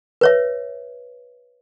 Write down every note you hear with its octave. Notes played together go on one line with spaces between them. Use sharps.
B4 C#5 E5